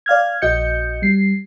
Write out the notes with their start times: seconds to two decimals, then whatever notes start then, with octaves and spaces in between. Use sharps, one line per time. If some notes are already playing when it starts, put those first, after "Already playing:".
0.06 D5 F5 F6 G#6
0.42 A#1 F#4 D#5 G6 C#7
1.02 G3 C7